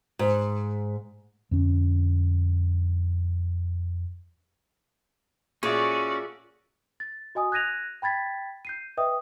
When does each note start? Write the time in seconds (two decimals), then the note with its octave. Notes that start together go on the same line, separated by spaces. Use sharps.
0.19 G#2
1.51 F2 D3 C#4
5.63 A#2 C#4 F#4 G#4 A4 D5 E5
7.00 A6
7.35 F#4 D#5 G#5 D#6
7.52 F#6 G#6 A#6 D#7 F7
8.02 G5 B5 G#6 A6 B6
8.65 G6 C7 D#7
8.97 B4 D#5 E5 G5 D#6